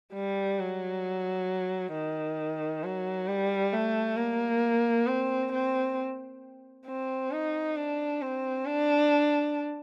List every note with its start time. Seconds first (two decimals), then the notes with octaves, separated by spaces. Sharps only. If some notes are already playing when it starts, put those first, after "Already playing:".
0.14 G3
0.59 F#3
1.93 D#3
2.83 F#3
3.28 G3
3.73 A3
4.17 A#3
5.07 C4
5.52 C4
6.87 C4
7.31 D#4
7.76 D4
8.22 C4
8.66 D4